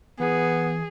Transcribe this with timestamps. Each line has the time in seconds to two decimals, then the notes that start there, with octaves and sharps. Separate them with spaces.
0.20 E3 B3 G#4